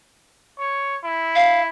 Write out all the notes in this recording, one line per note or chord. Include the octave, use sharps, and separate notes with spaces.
C#5
E4
F5